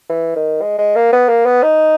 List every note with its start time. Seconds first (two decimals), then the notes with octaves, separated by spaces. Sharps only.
0.09 E3
0.36 D#3
0.62 G#3
0.79 G#3
0.96 A#3
1.13 B3
1.29 A#3
1.46 B3
1.63 D#4